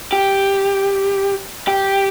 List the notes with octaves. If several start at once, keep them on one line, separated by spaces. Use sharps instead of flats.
G4
G4